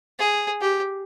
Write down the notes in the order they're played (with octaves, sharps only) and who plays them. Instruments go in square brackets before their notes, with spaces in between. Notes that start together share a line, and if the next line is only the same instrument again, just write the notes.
[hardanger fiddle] G#4
G4